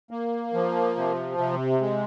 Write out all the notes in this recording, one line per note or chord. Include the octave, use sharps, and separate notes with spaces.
A#3
F3
C3
C3
G#3